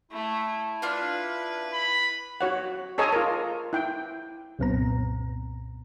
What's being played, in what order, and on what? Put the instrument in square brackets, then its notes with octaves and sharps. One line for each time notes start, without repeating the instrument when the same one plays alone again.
[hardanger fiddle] A3 [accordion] E4
[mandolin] D4 F4 F6 [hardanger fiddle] B4
[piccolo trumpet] B5
[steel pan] F#4 C#5 F#5
G#4 A4 C#5 D#5 G#5 A#5
F4 A#4
E4 G5
[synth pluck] C2 F#2 A#2 B3 C4 A#5